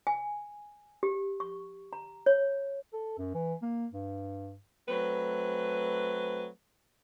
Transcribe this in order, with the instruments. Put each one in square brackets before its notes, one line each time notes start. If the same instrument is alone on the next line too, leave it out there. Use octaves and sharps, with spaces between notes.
[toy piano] G#5
G4
C#6
A#5
C#5
[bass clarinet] A4
F#2
E3
A#3
G2
[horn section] F#3 A3 C4 B4